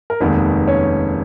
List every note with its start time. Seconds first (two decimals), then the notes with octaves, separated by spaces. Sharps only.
0.10 A#4
0.20 F1 D#2 D#3 G#3 B3 B4
0.68 C#4 C#5